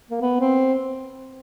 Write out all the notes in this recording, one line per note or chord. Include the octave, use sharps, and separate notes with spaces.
A#3
B3
C4